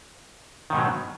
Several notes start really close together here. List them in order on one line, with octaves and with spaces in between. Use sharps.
D#3 G#2 B2 F#3